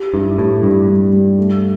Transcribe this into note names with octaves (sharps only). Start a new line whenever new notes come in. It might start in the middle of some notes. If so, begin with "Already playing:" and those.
Already playing: G4
G2 E4
A2 G4
G2 G3
G3
G3
A3